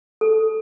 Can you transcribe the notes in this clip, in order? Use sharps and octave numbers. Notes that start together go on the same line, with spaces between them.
A4